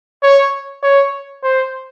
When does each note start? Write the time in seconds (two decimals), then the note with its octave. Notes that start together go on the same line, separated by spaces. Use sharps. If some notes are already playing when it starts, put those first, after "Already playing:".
0.23 C#5
0.83 C#5
1.43 C5